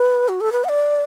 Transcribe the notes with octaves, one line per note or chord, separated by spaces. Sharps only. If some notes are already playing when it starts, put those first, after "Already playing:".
Already playing: B4
F#4
A4
B4
F#5
D5